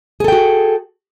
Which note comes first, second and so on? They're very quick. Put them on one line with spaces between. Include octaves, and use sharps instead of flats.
G#4 A4 G5 F#4